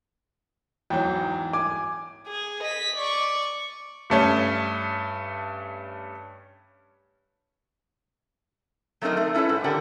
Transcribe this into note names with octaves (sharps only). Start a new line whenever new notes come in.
E2 G#2 F#3 G5
G#5 D6
G#4
D#5 B6
D5 C#6
G2 A3 C#4
F#3 A3 C4 D#4 A#4 D#5
A3
C#4 E4 A4 B4 C#5
G#2
D3 G4 A#4 D5 F#5 G5